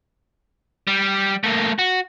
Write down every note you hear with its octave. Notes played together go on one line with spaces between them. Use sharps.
G3
A3 A#3
F#4